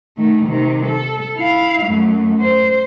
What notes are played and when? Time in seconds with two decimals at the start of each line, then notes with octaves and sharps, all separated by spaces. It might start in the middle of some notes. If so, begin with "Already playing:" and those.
0.17 D#3 A3
0.46 C3 D#3
0.86 A4
1.38 E4 F5
1.86 F#2 A3
2.40 C5